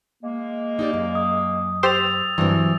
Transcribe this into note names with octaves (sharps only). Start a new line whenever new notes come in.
G#3 A#3
D#4 G4 D5
F#2
D#6
G4 C5 E6 A6 F7
G2 E3 F#3 C4